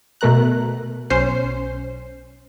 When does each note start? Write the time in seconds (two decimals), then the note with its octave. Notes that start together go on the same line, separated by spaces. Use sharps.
0.21 B2 A3 A#4 A#5 F#6
1.10 B1 C#4 C5 C7